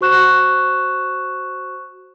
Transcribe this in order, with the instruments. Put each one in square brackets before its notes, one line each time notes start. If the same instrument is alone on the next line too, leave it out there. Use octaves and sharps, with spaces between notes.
[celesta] F#4 C5 C#6 F#6 E7